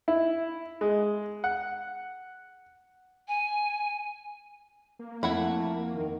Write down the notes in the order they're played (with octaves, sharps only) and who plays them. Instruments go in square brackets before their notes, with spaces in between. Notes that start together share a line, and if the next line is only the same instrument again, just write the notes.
[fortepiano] E4
G#3
F#5
[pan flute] G#5
[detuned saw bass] A#3
[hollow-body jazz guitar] F2 [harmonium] A3 [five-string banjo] E4 F#5 B5
[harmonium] D#3